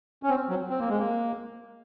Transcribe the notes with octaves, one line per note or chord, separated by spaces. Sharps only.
C#4
C4
F#3
C4
A#3
G#3
A#3